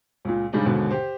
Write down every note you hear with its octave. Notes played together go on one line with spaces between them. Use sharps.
C#2 A#2
G#2 C#3 G3 G#3 D4 D#4
D#2 G#2 B2 D3
G4 C5